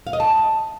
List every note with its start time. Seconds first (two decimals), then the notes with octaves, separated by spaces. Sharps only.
0.07 F5
0.13 D#5
0.20 A5